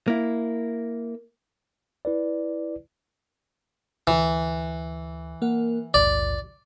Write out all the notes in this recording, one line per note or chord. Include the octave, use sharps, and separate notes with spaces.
A#3 E4
E4 B4 D5
D2 E3
A#3 A#4 F#5
A#1 D#2 G#2 D5